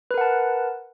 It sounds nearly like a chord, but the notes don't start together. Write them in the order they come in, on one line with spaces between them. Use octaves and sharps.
B4 A#4 F#5 A5